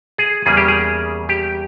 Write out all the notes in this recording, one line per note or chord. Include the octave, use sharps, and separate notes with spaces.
G#4
E2 C#3 G3 A#3 G#4
G4
G#4
G4